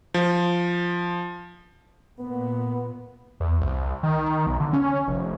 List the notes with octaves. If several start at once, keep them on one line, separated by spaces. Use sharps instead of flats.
F3
A#2 B3
E2
C2
D#3
B1
D3
C#4
F1